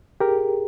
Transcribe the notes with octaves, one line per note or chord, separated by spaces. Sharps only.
G4 G#4 A#4